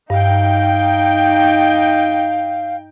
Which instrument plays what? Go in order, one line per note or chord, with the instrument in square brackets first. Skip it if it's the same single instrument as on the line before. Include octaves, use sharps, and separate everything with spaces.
[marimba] G2 [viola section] D#4 G5 [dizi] F5